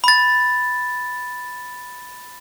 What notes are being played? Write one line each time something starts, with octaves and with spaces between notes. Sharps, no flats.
B5 A6